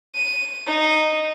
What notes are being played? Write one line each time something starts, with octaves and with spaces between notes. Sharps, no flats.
D#7
D#4